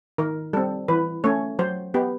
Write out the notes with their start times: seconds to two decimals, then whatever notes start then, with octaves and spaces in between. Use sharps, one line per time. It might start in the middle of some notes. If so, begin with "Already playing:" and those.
0.18 D#3 A#4
0.53 G3 C4 A4
0.88 E3 B4
1.24 A3 C#4 C#5
1.59 F#3 C5
1.94 B3 G4